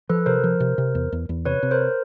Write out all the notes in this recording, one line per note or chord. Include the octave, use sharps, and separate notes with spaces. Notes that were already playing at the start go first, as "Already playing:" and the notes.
F3 A4 B4
C3 A#4 C5
F3
C3
C3
E2
E2
E2
C3 B4 C#5
C3
A#4 C5